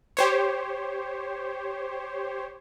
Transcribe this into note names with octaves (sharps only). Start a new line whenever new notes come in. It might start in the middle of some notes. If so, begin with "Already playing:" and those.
G4 C5 C#5